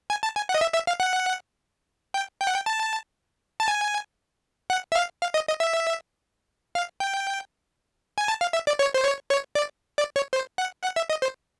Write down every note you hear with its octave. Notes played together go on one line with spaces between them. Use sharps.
G#5
A5
G#5
F#5
D#5
E5
E5
F5
F#5
G5
G5
F#5
G5
A5
A5
G#5
F#5
E5
F5
F5
D#5
D#5
E5
F5
G5
G#5
A5
F5
E5
D5
C#5
C5
C#5
C#5
D5
D5
C#5
C5
F#5
F#5
E5
D#5
C5